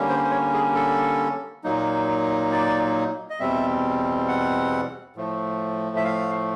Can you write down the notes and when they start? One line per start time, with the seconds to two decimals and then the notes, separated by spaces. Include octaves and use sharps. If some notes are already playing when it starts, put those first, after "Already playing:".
Already playing: D3 G3 A#3 C#4
0.09 C5
0.24 C5
0.31 C#5
0.54 G#4
0.75 A4
1.64 A#2 F#3 A#3 D#4
2.52 D5
3.30 D#5
3.40 E2 B2 G3 C4 E5
4.28 F#5
5.16 A2 F3 A3
5.97 E5
6.05 F5